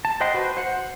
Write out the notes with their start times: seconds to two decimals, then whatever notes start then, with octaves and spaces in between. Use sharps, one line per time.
0.05 A5
0.20 C5 D#5 F#5 G5 C6
0.34 F#4 B4 C5
0.57 C5 F#5